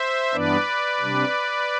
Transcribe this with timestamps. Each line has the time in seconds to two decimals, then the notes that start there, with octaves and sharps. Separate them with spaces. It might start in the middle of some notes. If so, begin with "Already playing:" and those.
Already playing: C5 E5
0.33 G2 E3 B3 D4 B4 D5
1.00 C3 G3 D4